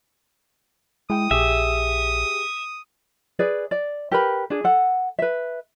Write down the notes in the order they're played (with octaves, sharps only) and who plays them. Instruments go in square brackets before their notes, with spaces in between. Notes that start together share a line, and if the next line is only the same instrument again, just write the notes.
[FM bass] G#3 [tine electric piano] E4 G5 [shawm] D#6
[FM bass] A#1 [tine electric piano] G4 G#4 [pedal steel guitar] E5
[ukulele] G#4 B4 D5
D5
G4 A#4 B4 B5
D4 G#4
A4 F#5
B4 E5